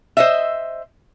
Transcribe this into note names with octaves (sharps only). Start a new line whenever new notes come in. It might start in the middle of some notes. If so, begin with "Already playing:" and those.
C5 D#5 E5